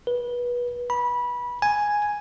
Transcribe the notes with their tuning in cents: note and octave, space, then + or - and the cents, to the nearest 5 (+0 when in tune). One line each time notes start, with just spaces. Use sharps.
B4 -25
B5 -20
G#5 +0